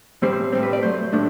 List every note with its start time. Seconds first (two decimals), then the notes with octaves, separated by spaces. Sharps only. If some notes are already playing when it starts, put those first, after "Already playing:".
0.22 A2 G3 C4 C5
0.52 A2 G3 C4 C5
0.63 B4
0.73 D5
0.83 A2 F#3 A3 C5
1.13 A2 F#3 A3 D4